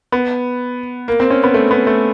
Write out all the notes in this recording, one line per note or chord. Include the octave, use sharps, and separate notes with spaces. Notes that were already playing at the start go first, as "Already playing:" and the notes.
B3
A#3
C4
C#4
B3
A3
B3
A3